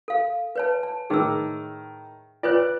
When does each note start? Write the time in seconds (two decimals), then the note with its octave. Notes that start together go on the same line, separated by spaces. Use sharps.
0.08 A4 F5
0.56 B4 C#5 A5
0.83 A5
1.10 A2 D#3 G#4 E6
2.43 F4 B4 C#5 D5 F#6